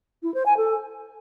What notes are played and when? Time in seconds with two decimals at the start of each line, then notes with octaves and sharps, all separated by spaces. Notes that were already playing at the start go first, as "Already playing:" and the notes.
0.23 E4
0.34 C5
0.46 G#5
0.57 A4